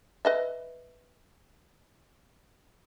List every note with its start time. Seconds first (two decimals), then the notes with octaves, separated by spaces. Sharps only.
0.25 B4 D#5 E5